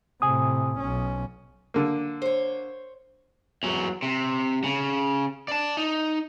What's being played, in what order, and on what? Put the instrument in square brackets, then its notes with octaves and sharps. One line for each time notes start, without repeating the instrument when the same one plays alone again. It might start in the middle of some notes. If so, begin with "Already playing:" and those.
[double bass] A2 C3 [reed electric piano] G#5 D#6
[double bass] B1 C#4
[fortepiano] D3 A#3
[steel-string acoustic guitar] C5 C#5
[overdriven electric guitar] E2 F#3
C3
C#3
D5 A5
D#4